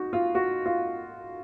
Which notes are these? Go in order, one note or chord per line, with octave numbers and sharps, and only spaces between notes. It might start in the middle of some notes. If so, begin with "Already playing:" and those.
Already playing: D#4 F#4
F4
F#4
F4